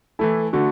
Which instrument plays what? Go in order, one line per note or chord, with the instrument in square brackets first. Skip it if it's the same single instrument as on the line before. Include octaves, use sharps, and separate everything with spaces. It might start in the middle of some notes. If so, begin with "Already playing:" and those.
[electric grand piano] E3 A3 E4 [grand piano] A4
[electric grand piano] D3 A3 [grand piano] F#4